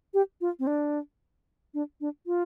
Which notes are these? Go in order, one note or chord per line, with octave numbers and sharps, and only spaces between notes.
G4
F4
C4
D4
D4
D4
F4